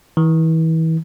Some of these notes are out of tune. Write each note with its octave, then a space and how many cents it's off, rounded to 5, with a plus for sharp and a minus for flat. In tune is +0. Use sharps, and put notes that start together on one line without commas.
E3 -35